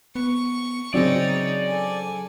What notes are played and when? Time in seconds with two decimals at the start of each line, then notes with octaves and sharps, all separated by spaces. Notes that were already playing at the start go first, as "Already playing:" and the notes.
0.15 B3 C#6
0.94 C#3 F#3 C4 C#4 D#4 C#5 D5
1.67 A4 G#5